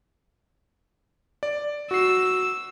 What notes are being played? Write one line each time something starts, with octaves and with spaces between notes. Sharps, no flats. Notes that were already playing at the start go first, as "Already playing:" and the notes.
D5
F#4 E6 C7